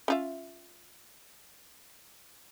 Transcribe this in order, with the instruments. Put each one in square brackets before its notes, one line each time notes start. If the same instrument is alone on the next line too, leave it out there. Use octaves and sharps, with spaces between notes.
[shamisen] C#4 F4 E5